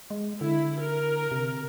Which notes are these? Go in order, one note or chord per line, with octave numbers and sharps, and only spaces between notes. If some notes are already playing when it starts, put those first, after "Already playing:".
G#3
D3 E4
A#4
C3